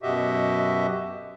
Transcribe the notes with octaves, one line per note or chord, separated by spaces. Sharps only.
F#2 B2 F#4 G4 D#5 E5